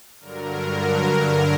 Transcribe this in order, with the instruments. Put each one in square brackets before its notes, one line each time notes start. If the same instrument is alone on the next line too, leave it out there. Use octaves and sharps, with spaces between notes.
[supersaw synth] G2 D3 F#3 A#4